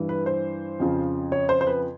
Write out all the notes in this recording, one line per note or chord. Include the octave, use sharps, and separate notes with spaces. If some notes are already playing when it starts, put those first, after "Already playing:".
Already playing: G2 E3
B4
C5
F2 C#3 F3
C#5
C5
C5
B4